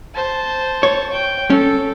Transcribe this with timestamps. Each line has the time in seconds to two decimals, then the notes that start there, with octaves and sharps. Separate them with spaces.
0.14 C5 A5
0.83 C#5
1.13 G5
1.50 C#4 A4